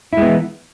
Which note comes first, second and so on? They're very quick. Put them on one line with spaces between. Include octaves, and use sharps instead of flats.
E4 G#3 B3 E3